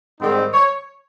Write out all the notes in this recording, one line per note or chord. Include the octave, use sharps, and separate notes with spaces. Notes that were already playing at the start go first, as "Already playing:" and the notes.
G#2 D#3 G3 C4 D#4
C#5